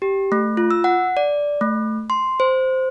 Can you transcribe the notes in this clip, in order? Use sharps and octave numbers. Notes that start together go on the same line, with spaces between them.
G4
A3
F4
E6
F#5
D5
A3
C6
C5